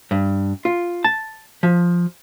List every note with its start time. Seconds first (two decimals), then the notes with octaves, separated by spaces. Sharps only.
0.11 G2
0.65 F4
1.04 A5
1.63 F3